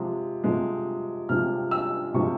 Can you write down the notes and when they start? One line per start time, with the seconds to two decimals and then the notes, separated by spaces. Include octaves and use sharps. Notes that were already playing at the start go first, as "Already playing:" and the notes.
Already playing: C3 F3 G#3
0.44 C3 F3 G#3
1.29 C3 F3 G#3 F6
1.71 E6
2.14 C3 F3 G#3 C#6